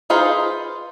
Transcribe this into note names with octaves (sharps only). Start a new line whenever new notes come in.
D#4 F4 G#4 B4 C5